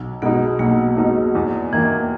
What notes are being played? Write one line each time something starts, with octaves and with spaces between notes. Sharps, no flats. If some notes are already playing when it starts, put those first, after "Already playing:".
Already playing: B1
B2 G#3 B3 D#4
B1 A#3
B2 G#3 D#4
E2
D#3 E3 A#3